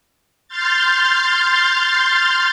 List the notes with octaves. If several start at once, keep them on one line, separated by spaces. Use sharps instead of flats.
C6 F6 G6 A6